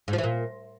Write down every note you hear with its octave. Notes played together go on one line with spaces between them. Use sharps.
G#2
F3
E3
A#2